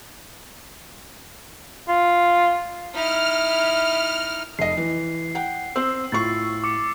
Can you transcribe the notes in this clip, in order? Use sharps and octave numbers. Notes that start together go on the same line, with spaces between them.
F4
D#4 E4 F6
F1 D#5 C7
E3
F#5 G5
C4 C5 E6
A2 F4 C#6 A6 C7
D6 C#7